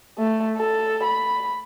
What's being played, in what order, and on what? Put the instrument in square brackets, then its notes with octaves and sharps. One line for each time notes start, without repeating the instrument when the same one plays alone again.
[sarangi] A3
A4
B5